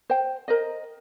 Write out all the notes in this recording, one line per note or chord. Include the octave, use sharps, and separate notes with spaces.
C5 G5
A#4 C5 D#5